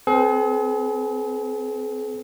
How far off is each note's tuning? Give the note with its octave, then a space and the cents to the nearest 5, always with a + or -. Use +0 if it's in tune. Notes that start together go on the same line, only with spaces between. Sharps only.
C4 +0 G#4 +45 B4 +0